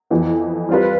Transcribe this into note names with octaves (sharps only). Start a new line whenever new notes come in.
F2 E3 B3
G3 C4 F4 B4